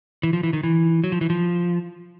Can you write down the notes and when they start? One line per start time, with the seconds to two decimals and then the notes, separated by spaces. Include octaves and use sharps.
0.23 E3
0.33 F3
0.43 E3
0.53 D#3
0.63 E3
1.04 F#3
1.12 F3
1.21 E3
1.30 F3